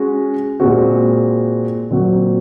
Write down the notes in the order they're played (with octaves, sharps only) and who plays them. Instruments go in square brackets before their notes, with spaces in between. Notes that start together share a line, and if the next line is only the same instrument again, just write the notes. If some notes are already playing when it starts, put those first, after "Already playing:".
Already playing: [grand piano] G#3 C#4 F#4
A#2 G#3 C4 F#4
A#2 F#3 C4 F#4